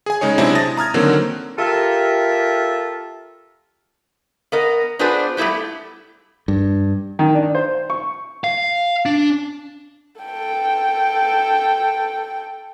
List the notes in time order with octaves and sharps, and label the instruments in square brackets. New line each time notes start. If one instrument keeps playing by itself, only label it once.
[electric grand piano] G#4 G#5
C#3 G#3 D#4 G#4 C#5
C3 F#3 G#3 C4 D4 E4
A5 D#6 A6 A#6
A#5 D#6 F6 G#6
D3 D#3 F#3 A#3 C4
[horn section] F4 G4 A4 A#4 E5
[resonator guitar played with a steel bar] B3 A#4 D#5
B3 D4 F4 G#4 B4 C5
G3 A3 B3 E4 G4
[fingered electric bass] G2
[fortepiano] D#3
D4
C5
C#6
[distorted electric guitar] F5
D4
[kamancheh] A4 G5